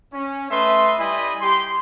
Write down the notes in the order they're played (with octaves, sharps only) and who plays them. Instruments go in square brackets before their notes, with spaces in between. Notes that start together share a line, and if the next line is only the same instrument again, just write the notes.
[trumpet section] C#4
A3 B4 D#5 E5 C6
G3 E4 D#5 G#5 B5
G4 C6